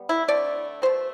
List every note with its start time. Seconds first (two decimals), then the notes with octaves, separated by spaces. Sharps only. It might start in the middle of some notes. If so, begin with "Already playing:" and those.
Already playing: G3 B3
0.09 E4
0.28 D3 A3 C4 D5
0.82 B2 A3 C4 C5